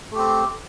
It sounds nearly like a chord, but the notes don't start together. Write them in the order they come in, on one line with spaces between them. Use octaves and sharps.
A3 G4 C4